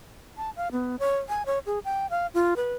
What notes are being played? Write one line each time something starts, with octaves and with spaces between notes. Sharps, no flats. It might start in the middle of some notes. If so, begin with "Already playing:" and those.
A5
F5
B3
C#5
G#5
C#5
G#4
G5
F5
F4
B4